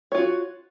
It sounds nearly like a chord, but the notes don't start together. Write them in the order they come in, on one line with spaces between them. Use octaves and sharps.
C#5 F4 F#4